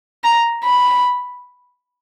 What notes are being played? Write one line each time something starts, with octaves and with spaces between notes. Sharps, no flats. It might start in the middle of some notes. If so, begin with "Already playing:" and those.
A#5
B5